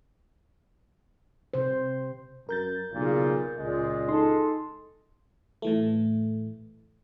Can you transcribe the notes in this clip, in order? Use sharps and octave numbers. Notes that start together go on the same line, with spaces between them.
C3 C5
F#2 A#4 G6 A6
B1 A#2 C#3
C#2 A#2 G#3
D#4 A4 C6
A2 E3 A3